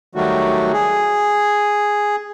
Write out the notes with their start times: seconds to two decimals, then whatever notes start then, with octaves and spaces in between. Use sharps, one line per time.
0.15 D#3 F#3 G3 A3 F#4
0.73 G#4